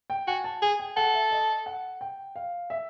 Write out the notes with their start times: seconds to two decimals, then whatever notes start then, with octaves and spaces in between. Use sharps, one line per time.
0.10 G5
0.28 F#4 G#5
0.44 A5
0.62 G#4 G#5
0.80 G5
0.96 A4 F#5
1.14 E5
1.31 D#5
1.66 F#5
2.01 G5
2.36 F5
2.70 E5